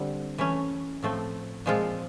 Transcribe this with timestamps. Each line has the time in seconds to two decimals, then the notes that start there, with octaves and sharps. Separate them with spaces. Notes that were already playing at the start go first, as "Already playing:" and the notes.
Already playing: D3 G3 C4
0.38 E3 A3 C#4
1.02 A2 F3 A3 C4
1.66 A#2 F3 G#3 C4 F4